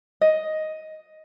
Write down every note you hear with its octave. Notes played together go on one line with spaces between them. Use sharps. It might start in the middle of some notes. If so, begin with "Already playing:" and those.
D#5